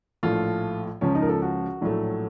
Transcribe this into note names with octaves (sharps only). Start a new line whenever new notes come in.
A#1 A2 F3 A3 F4
C#2 C#3 F3 C#4
D#4
A#4
A4
F#4
A#1 A2 F#3 A3